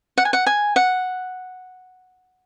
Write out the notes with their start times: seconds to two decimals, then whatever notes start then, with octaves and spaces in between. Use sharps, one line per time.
0.18 F#5
0.25 G#5
0.33 F#5
0.46 G#5
0.76 F#5